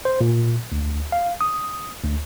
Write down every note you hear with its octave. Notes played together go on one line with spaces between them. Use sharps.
C5
A#2
D2
F5
D#6
D2